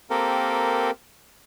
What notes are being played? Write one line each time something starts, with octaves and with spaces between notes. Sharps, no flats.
A#3 C4 G4 A4 A#4